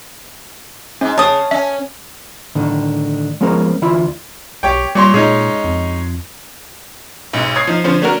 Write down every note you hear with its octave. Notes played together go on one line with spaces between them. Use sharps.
G#2 C#4
C#3 C#5 A5 D#6
C#4 E5
A2 D3 D#3
F3 G#3 B3 C#4 A#4 C5
D2 E3 E4 F4 E5 B5
B1 G4 C#5 G5
A#2 G3 C#5 C6
A#2 G#3 C#4 D#4
F2
B1 G#2
C#5 D#6 G#6 C7
F3 D#4
D3 F3 C#4 C5
A3 C#4 D4 F#4 A#4